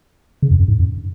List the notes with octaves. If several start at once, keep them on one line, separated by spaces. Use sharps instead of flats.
C#3
F2
F#2
G#2
F#2